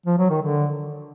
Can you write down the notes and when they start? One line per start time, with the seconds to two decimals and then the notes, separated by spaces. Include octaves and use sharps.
0.06 F3
0.18 F#3
0.30 D#3
0.42 D3